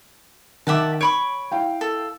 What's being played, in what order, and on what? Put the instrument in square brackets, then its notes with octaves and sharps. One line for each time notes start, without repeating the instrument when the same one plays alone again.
[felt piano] D#3 D6 [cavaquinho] E5 F#5 A5
[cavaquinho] C#5 B5 C#6 [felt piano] D7
[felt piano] E4 F5 G5
[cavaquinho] A4